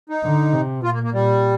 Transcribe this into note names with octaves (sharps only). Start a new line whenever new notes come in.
D#4
D3
C3
A#2 F4
A#3
A#3
A#2 G3